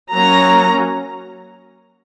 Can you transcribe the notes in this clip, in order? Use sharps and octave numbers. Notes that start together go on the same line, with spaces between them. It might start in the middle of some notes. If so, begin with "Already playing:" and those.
F#3 A#3 C#4 A#5